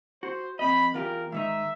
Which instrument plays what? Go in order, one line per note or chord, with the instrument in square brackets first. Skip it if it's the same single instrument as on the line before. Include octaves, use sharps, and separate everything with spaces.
[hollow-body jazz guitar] F#4 [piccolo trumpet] C5
[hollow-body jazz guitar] F2 C4 D#5 [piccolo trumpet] B5
[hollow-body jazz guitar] E2 F4 G4 [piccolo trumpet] A#4
[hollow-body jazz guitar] G#2 D#3 D#4 [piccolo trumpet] E5